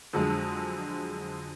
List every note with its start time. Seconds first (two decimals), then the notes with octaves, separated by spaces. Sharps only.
0.13 F2 D3 F#3 G#3